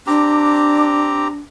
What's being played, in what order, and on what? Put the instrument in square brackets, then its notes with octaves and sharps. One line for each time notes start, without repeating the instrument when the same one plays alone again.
[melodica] C4 G4 A#5 [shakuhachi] D4